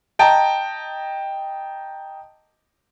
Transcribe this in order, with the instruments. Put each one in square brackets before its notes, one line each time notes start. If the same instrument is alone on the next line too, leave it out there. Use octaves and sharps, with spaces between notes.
[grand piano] D#5 G5 A5 A#5